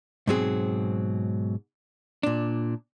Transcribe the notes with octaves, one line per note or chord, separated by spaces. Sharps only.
G#2 B2 F#3 C4 G#4
A#2 D4